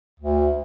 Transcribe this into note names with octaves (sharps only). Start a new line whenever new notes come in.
D2